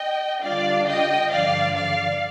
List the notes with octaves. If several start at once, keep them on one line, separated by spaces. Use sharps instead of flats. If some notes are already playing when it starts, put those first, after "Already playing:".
Already playing: D#5 G5
D3 G3 D4 F4 D5 F5
D#5 G5
G2 D3 F3 D5 F5
D5 F5